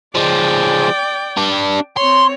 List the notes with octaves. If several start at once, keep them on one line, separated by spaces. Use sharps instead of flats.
F3 G#3 D5 G5
D4 G4
C4 C#5 C6